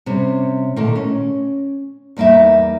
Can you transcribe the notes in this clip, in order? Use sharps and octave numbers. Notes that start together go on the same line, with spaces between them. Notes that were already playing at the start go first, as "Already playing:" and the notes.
C3 G3 C#4
A#2 D3 D#3 A3
C#4
E2 G3 A#3 D#4 E5